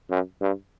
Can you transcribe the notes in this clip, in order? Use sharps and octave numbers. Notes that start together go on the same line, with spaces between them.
F#2
G2